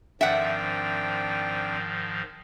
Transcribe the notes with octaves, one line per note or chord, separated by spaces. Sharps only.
G#2 D#3 F3 C4 D4 E5 F#5 G5